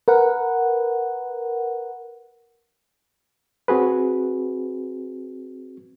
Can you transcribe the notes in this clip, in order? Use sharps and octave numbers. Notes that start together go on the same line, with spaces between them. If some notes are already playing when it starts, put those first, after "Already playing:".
A#4 B4 F#5
C4 F#4 G#4 B4